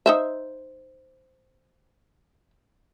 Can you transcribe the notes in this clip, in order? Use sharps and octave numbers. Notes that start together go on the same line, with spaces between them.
D#4 C5 E5